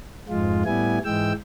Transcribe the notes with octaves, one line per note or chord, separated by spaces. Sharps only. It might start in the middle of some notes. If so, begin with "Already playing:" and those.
F2 G#2 G#3 F4
A2 G3 B3 E4 G#5
G#2 E3 G#3 G5 E6